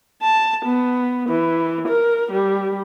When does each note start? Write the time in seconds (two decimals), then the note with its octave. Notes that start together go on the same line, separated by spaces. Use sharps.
0.22 A5
0.65 B3
1.29 E3
1.88 A#4
2.32 G3